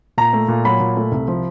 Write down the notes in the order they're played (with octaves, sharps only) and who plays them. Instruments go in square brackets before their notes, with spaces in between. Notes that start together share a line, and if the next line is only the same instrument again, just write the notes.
[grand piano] A#2 A#5
A3
A#2
F#3 B5
A#2
A3
C2
F3